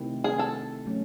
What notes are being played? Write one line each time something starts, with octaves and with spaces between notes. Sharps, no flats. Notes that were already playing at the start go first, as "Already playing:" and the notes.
Already playing: C3 D#3 A3 C4 E4
G#4
A4
F#3 A3 C#4